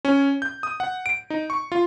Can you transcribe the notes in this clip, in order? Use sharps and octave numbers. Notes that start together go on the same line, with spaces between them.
C#4
G6
D#6
F#5
D7
D#4
C#6
F4